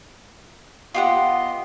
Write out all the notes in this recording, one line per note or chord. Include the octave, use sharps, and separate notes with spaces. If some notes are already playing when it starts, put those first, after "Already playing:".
B3 F4 G4 D#5 F#5 C6